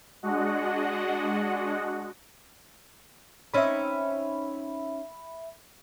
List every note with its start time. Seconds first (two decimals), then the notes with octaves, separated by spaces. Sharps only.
0.23 G#3 D4 F#4 D#5 F#5
3.54 C4 C#4 D#4 E5 B5